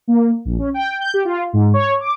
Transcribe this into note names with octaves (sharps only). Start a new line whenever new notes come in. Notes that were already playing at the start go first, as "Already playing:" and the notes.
A#3
A#1
C#4
G5
G6
G4
F4
G#2
C#5
D6